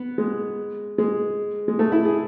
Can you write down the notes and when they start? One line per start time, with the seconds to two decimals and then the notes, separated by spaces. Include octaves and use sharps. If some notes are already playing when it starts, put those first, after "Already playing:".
Already playing: B3
0.18 G#3
0.98 G#3
1.68 G#3
1.79 A3
1.92 E4
2.05 G#4